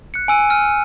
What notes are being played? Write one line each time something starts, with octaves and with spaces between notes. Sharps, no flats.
F#6 C#7
G#5 E6 D#7
F6 D#7